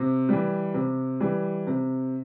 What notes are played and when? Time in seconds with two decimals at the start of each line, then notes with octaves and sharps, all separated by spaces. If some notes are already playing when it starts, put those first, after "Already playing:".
Already playing: C3
0.29 E3 G3
0.74 C3
1.20 E3 G3
1.67 C3